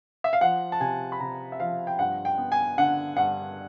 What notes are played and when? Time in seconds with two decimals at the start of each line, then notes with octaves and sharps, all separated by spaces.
0.24 E5
0.33 F5
0.41 F3 F#5
0.72 A5
0.80 C3 G#5
1.12 B5
1.20 C3 A#5
1.52 E5
1.60 F3 F5
1.87 G5
1.99 G2 F#5
2.25 G5
2.38 B3
2.52 G#5
2.78 D3 F#5
3.17 G2 F#5